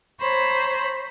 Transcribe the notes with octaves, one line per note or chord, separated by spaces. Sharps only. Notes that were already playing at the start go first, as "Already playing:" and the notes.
C5 C#5 A#5 B5